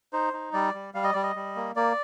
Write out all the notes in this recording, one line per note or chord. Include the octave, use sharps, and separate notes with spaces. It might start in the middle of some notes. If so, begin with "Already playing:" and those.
D#4 C5
D#4
G3 D5
G3
G3 F5
D#5
G3 D5
D#5
G3
A#3
A#3 D5